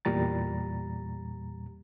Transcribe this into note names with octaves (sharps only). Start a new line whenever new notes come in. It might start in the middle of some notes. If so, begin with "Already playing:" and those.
E2 A#2 G3 A#5 A6